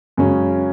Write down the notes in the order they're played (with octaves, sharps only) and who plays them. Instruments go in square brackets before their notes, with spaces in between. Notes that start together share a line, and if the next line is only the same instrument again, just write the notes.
[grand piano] F#2 C#3 G#3 C#4